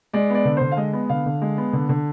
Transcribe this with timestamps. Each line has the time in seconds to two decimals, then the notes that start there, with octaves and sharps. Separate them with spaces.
0.13 G#3 D5
0.30 B3 D5
0.45 D3
0.57 D3 C5
0.72 F5
0.77 G#3 D#5
0.93 B3
1.09 D3 F5
1.26 D3
1.42 G#3
1.58 B3
1.73 D3
1.89 D3